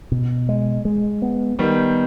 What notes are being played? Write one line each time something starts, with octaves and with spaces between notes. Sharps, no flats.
B2
G#3
G#3
B3
D#3 G3 B3